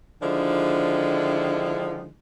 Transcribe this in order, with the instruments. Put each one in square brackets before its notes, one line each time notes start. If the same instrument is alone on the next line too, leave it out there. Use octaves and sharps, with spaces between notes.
[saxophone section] D3 D#3 F3 G#3 D4 E4